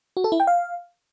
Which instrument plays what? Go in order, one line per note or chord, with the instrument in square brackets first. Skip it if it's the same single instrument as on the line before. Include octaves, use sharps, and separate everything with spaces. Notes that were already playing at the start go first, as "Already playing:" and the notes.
[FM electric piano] F#4
A4
E4
G5
F5